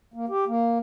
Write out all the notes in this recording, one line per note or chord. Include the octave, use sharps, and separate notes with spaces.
A#3
G4
A#3